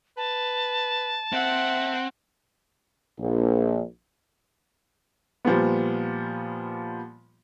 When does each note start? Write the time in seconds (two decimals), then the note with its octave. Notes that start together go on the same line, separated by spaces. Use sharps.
0.17 B4 A5
1.33 C4 E5 F#5
3.18 A#1
5.45 A#2 F3 G3 B3